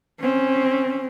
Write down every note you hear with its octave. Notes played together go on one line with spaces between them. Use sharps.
C4 C#4